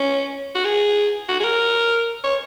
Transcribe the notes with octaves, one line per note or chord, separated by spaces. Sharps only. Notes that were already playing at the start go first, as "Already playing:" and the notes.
Already playing: C#4
F#4
G#4
F#4
G#4
A#4
C#5